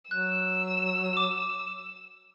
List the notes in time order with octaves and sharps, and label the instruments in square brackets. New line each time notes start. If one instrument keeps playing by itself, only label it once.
[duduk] F#3 [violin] E6 [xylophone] F#6
[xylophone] D6